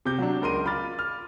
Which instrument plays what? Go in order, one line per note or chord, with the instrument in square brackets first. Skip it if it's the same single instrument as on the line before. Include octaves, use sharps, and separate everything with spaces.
[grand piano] C3 D6 G6
F#3 D4
C#2 A#4 C6 D#7
F4 B5 D6 F6 A6
F6